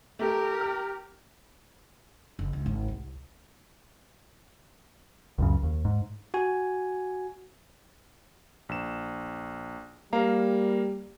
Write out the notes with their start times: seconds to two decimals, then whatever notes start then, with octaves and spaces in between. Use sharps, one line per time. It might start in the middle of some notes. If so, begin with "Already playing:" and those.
0.19 A3 G4 A4 A#4
0.60 F6
2.39 F#1
2.53 C#2
2.66 G#1
2.88 C2
5.38 C#2 F#2 C#3
5.63 D#2
5.85 G#2
6.34 F#4 G#5
8.69 A#1 E7
10.13 G3 A#3 F5 A#5